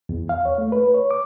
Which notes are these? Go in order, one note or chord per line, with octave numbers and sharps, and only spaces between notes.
E2
F5
C#5
A3
B4
C#5
D6